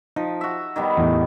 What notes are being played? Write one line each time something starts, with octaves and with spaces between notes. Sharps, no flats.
F3 D#4
F#4 E5
D#3 G3 B3
E2 A2